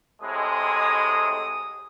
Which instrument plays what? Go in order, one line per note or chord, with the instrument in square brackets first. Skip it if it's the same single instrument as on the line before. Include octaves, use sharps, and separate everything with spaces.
[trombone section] A2 C3 G#3 [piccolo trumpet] D#6